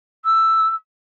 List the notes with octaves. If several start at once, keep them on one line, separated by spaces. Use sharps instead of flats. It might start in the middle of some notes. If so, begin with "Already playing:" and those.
E6